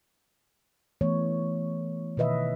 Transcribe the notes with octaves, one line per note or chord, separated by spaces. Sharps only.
E3 A3 B3 C#5
B2 D#3 B4 D#5 E5